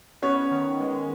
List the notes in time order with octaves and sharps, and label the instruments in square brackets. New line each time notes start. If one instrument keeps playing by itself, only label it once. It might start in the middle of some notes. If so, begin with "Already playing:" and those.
[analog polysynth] B3 [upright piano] C#4 C#5
[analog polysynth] D#3
G#3